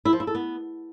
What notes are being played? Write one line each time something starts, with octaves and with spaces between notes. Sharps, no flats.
E4
F3
E4
A4
B3